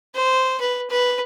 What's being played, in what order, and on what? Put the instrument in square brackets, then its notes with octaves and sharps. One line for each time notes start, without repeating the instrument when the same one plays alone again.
[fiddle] C5
B4
B4